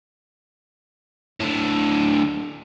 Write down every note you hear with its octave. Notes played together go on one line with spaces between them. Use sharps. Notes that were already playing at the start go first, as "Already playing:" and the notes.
A2 D3